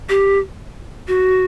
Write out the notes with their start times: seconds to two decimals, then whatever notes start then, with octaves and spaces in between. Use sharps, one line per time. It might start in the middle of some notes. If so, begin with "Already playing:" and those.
0.09 G4
1.08 F#4